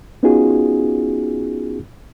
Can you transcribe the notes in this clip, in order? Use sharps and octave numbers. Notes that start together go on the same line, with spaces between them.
B3 C#4 D#4 F4 F#4 G#4